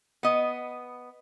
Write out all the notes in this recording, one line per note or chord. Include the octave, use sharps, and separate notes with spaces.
B3 D#5